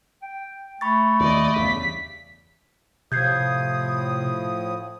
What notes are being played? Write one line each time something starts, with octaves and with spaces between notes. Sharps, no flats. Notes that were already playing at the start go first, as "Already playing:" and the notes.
G5
A3 B5 C#6 A6
D#2 D5 D#5
E2 G2 C#3 B6
A2 C3 F3 D#6 G6 G#6 C7